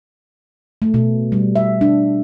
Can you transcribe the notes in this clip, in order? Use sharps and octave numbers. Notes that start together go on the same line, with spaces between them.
A3
B2
G3
E5
D4